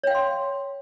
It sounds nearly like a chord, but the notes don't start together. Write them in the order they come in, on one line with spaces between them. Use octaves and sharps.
C#5 G5 F5 C6